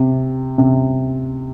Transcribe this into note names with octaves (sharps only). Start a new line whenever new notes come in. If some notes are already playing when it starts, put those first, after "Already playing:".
Already playing: C3
C3